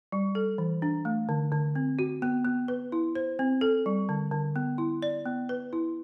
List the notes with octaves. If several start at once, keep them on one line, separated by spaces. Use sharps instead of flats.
G3
A4
E3
D4
A3
D3
D3
C4
F#4
B3
B3
B4
E4
C5
C4
A4
G3
D3
D3
B3
E4
D5
B3
B4
E4